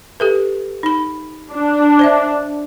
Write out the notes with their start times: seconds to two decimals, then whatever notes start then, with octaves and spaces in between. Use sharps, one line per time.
0.20 G4 A4 B4
0.83 D#4 B5
1.53 D4
1.99 C5 D5 E5